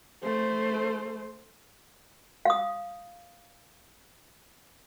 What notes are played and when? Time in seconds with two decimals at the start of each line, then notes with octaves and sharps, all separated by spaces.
0.24 A3 C5
2.45 F5 D#6